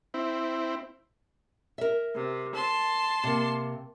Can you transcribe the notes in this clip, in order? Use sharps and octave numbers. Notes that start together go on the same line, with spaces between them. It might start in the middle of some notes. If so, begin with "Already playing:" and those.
C4 E4
A#4 E5
C3
A5 C6
C3 A#3